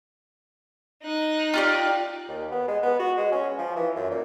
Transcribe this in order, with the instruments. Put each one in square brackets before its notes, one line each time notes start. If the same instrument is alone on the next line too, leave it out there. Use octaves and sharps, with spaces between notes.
[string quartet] D#4 F#6
[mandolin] F4 G4 D5
[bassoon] D#2
B3
G#3
B3
F#4
G#3
C#4
F3
E3
F#2
A#2